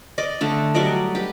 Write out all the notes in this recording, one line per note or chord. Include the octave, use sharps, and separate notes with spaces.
D5 D#5
D3 A3
F#3 G3 D5 D#5
G4 B4